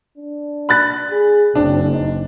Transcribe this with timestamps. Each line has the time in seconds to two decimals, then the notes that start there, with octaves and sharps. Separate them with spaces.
0.17 D4
0.69 B5 F#6 A6
1.11 G#4
1.55 F#1 C4 D4
1.93 D#4